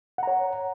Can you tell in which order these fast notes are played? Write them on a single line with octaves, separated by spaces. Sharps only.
F#5 A#5 C#5